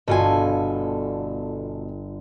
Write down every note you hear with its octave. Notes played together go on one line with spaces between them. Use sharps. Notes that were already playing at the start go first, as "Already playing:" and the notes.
G1 B2 F4 A4 G#5